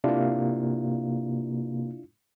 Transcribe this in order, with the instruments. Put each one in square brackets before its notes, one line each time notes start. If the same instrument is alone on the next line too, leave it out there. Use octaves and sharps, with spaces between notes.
[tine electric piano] C3 A#3 [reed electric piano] D4 E4 F4